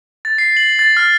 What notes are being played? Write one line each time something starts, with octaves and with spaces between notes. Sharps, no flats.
A6
C7
F#7
A6
F6